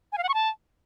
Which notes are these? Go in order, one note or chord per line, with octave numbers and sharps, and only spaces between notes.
G#5
F5
F#5
C#6
A5